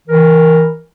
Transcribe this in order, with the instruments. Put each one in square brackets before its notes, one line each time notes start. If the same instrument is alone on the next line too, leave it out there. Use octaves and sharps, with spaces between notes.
[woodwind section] E3 A#4